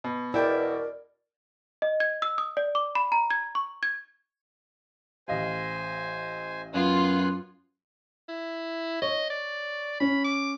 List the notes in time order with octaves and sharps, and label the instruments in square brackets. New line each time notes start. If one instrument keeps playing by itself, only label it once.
[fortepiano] B2
[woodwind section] E2 B2 [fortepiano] E4 G5 [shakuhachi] A#4 [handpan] D5
[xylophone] D#5
G#6
E6
D#6
D5
D6
B5
A#5
G#6
C#6
G#6
[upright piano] A1 D#5 F5 [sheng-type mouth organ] C5 G#5
[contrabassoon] F#2 [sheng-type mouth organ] B3 G#5 F#6 [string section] F4
[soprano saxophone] E4
[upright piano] C#5 [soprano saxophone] D#5
[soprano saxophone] D5
[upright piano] C#4 [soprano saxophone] B5
[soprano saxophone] D6